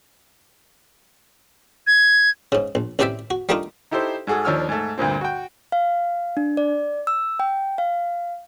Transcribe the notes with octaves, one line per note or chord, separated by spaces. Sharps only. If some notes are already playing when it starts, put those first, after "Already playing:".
G#6
G#2 C#3
A#1
A1 C3 G4 C5 D5 E5
F#4
G3 A3 A#3 D4 D#4 F4
D#4 E4 G4 A4 C5
G#2 F#4 G#4 A4
D#2 F3 D4 C#5 E6 F6
G#2 A3
D2 G2 A#2 C4
F#4 G5
F5
D4
D5
E6
G5
F5